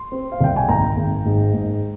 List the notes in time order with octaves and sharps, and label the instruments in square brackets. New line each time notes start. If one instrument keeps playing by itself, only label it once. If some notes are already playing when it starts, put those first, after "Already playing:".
Already playing: [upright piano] C6
C4
F5
C2 G5
G#5
G#1 G5 A#5
G#1
G#2
G#2